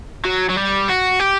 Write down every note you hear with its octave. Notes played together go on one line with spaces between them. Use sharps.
F#3
F#3
G3
F#4
G4